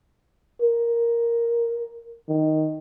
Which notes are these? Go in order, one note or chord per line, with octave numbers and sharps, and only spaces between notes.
A#4
D#3